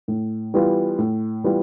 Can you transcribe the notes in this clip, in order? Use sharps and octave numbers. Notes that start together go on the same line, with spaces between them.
A2
E3 G3 B3 F4
A2
E3 G3 B3 F4